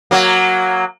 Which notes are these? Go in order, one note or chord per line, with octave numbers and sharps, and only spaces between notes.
F#3 A#3